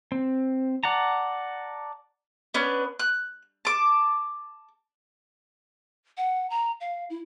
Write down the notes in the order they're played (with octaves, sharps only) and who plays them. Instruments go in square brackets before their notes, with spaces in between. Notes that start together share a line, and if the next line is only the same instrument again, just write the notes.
[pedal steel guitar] C4
D5 F#5 A5 A#5
[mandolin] B3 C#4 D4 B4
F#6
A5 D6
[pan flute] F#5
A#5
F5
E4